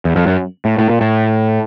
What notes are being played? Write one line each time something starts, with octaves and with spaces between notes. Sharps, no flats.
E2
F2
F#2
A2
A2
A#2
A2